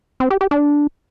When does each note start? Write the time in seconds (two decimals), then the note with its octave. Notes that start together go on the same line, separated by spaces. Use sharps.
0.20 C4
0.30 G4
0.41 G4
0.51 D4